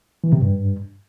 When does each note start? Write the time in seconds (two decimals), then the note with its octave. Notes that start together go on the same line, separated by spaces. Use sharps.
0.24 E3
0.33 C3
0.42 G2